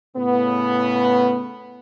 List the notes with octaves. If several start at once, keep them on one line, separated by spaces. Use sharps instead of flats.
A2 C#3 B3